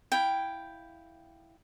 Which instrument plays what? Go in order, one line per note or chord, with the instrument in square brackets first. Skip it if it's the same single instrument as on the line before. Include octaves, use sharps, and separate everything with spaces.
[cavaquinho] E4 F5 G5